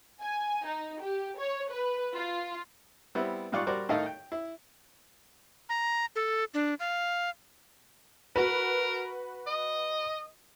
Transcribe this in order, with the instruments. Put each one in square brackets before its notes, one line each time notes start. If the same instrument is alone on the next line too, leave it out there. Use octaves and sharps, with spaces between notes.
[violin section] G#5
D#4
G4
C#5
B4
F4
[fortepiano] G3 B3 C4 E4
G#2 G3 F4 D5 C#6 F#6
G3 F#4 A#4 C5 D5
A2 D#3 D#4 A4 D#5 F5
G5
E4
[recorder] A#5
A4
D4
F5
[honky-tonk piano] F#4 B4 [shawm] A#4
[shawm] D#5